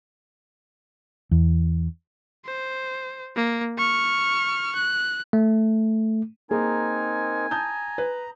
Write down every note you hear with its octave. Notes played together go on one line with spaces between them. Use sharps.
E2
C5
A#3
C#6 F6
F#6
A3
A#3 C4 D#4 G#4 A#4 G#5
A5 A#5 D#6 G6
B4